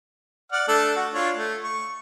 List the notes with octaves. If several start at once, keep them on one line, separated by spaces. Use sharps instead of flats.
D5 F#5 F6
A3 D4 A4
F#4
D4 F4 C#5
A3
C#6